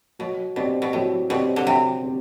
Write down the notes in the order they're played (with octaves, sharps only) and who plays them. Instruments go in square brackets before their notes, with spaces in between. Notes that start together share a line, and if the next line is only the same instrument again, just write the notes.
[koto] B2 [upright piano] F#3
[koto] B2 [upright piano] C4 G4 D5
[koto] B2
[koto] A2 [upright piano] F#3
[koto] B2 [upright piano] C4 G4 D5
[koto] D3
[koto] C3 [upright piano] F#3
[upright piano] C4 G4